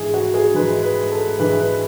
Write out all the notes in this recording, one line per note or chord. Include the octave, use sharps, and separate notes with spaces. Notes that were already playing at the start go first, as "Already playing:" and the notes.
Already playing: G#2 E3 G#3 G#4
F#4
G#4
G#2 E3 G#3 B4
B4
A4
G#2 E3 G#3 B4
B4